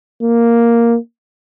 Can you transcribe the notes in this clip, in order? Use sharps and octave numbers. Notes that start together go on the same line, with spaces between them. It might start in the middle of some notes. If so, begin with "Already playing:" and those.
A#3